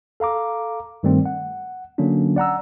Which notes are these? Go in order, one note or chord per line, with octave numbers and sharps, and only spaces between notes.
A4 F5 A#5 D6
G2 D#3 G3 A3 C4
F#5
D3 F#3 A#3 C#4 D4
D5 F#5 A#5 E6